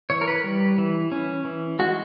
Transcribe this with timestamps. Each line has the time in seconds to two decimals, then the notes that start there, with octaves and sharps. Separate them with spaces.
0.10 E3 C#5
0.21 A#4
0.28 B4
0.44 G3
0.78 E3
1.12 C#4
1.45 E3
1.79 G#3 F#4